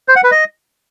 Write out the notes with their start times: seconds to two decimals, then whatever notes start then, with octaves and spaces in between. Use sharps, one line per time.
0.08 C5
0.16 F#5
0.24 B4
0.31 D#5